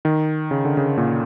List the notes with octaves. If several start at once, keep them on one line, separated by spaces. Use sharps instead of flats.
D#3
C#3
D3
C#3
A#2